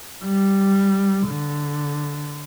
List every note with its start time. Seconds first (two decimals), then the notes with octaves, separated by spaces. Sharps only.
0.24 G3
1.28 D3